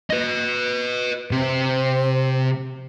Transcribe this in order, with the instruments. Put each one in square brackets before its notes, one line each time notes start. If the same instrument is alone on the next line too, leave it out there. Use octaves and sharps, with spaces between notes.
[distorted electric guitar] B4 D#5
[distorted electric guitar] C3 [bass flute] C4